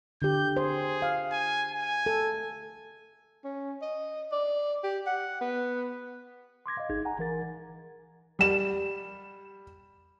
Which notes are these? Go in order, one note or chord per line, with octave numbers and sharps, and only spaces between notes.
D3 G4 G6
G#4 C5
F5
G#5
G#5
A4
C#4
D#5
D5
G4
F#5
B3
C6 D6 G#6 A#6
D#5 F5
G#1 D#4 G#4 G#6
F#5 G#5 A#5
E3 A#4 A6
G3 E7